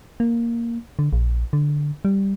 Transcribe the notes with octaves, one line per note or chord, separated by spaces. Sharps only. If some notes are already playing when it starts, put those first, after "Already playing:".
A#3
D3
A#1
D3
G3